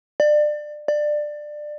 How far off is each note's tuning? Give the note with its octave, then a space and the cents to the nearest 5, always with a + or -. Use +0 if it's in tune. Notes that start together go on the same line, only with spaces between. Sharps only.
D5 +25
D5 +20